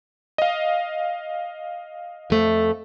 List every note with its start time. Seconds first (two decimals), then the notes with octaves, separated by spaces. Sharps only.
0.38 D#5 F5
2.30 F2 A3